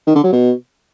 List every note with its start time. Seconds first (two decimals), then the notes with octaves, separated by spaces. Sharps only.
0.07 D#3
0.15 D3
0.24 F#3
0.33 B2